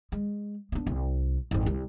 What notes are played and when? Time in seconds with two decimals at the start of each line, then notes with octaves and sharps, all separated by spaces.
0.12 G#3
0.72 B3 D4
0.87 C2
1.51 G#1 F2
1.66 C2